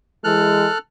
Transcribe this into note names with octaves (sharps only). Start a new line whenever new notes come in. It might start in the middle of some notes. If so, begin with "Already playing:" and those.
E3 G#3 A4 F6 F#6